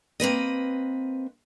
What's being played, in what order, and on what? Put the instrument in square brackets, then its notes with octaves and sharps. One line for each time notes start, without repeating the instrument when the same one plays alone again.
[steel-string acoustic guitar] A#3 C4 B4 D#5